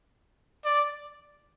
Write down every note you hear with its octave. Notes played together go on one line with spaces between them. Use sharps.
D5